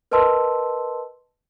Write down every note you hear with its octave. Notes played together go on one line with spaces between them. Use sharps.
A#4 B4 D#5 A5 C6 E6